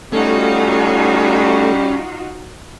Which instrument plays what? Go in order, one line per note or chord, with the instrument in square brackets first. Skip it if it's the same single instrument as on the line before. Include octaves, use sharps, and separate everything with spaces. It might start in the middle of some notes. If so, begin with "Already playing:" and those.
[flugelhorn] G3 [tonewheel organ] A3 A4 [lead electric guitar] C#4 [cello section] D#4 F4 F#4